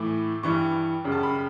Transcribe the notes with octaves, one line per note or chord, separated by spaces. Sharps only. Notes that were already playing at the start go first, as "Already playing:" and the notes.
Already playing: A2 E3 A3 D6
G2 E3 G3 C#6
F#2 C#3 G3
A5
B5